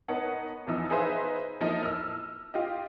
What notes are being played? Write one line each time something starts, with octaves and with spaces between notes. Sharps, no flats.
B3 D#4 A#4 C#5 F#5 A5
E2 E3 F3 D#4 E6
D#4 G#4 B4 C5 E5 F5
F3 F#3 A#3 D#4 E4 A4
E6 F6
F4 G4 D#5